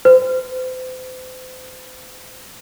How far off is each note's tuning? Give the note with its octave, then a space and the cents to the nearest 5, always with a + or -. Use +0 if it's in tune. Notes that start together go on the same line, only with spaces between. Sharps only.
C5 -35